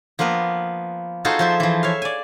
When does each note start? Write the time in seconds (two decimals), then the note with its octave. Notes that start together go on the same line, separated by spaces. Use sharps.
0.19 F3 A#3 B3 A#4 B4
1.25 D#4 F4 F#4 G#4 A4 C5
1.39 F3 C5 E5
1.60 E3 F3
1.83 C#5 E5 F5
2.02 D5 G#5